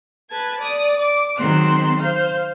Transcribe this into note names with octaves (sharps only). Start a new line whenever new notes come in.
B4 A5 G#6
D5 D#6
D6
D#3 F#3 G#3 C4 C6 F#6
C5 F5 F6 G6